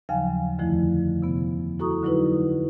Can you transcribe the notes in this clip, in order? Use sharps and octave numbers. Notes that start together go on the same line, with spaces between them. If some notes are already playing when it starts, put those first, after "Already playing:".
D#2 C#3 F3 F#3 F5 G#5
F2 D3 D#3 F3 A3 E4
C3 B3
E4 F#4 A4 A#5 C#6 D#6
D3 F#3 D#4 E4 B4